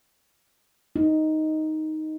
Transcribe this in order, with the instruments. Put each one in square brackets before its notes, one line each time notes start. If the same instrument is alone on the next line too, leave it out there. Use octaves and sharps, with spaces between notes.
[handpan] D#4